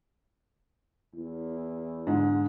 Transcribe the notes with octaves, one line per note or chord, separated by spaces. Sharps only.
E2
G#2 D3